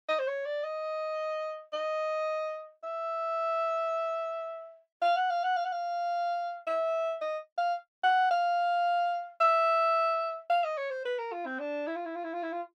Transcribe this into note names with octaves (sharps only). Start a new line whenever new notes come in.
D#5
C5
C#5
D5
D#5
D#5
E5
F5
F#5
F5
F#5
F5
F#5
F5
E5
D#5
F5
F#5
F5
E5
F5
D#5
C#5
C5
B4
A#4
F4
C4
D4
E4
F4
E4
F4
E4
F4
E4
F4